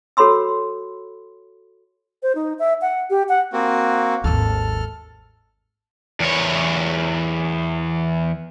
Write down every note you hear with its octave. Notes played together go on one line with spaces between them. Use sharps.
F#4 A4 C#5 B5 C6 E6
C5
D#4
E5
F#5
G4
F#5
A#3 C4 F#4
G#1 D#2 A4 F6
E2 C#5